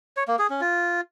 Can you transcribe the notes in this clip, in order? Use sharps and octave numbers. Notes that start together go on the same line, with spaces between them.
C#5
A#3
G#4
C#4
F4